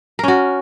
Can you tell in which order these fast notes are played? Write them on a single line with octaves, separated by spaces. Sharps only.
A#4 C#4 F#4